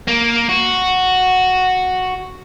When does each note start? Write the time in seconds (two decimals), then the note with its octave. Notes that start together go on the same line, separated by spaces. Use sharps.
0.08 A#3
0.49 F#4